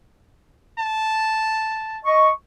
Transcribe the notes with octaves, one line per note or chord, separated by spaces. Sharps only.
A5
D#5 C#6